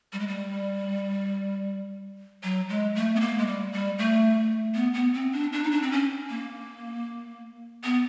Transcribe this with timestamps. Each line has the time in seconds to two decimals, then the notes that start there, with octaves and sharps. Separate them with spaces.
0.13 G3
0.20 G#3
0.28 G3
2.43 F#3
2.69 G#3
2.95 A3
3.16 B3
3.21 A#3
3.38 G#3
3.47 G3
3.73 G3
3.98 A3
4.75 B3
4.94 B3
5.14 C4
5.33 D4
5.53 D4
5.64 D#4
5.71 D4
5.82 C4
5.91 C#4
6.30 A#3
7.84 B3